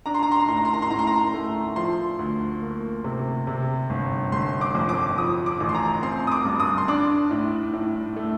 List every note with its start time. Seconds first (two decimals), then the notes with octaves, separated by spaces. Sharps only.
0.06 D4 A#5
0.14 C6
0.23 A#5
0.32 C6
0.40 A#5
0.48 A2 C6
0.57 A#5
0.65 C6
0.74 A#5
0.82 C6
0.91 A2 A#5
0.99 C6
1.07 A#5
1.34 A3
1.76 F3 C6
2.19 D2
2.62 A#3
3.04 C3
3.47 C3
3.90 G1
4.32 G1 C6
4.61 D6
4.75 F2
4.89 D6
5.18 F3 D#6
5.46 D6
5.60 A1
5.69 C6
5.75 A#5
6.03 C4 C6
6.27 D#6
6.32 D6
6.45 G2
6.60 D#6
6.78 C6
6.88 D4 D6
7.31 A2
7.74 A2
8.16 A3